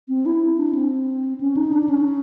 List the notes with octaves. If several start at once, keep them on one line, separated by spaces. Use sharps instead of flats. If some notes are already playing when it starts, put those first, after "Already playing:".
C4
E4
D4
C4
C#4
D#4
D4
C#4